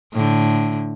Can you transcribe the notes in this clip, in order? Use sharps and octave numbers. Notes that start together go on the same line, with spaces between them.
A2 D3